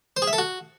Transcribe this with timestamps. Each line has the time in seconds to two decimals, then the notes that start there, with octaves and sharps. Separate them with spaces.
0.17 C5
0.22 G#4
0.27 E5
0.33 A4
0.38 F#4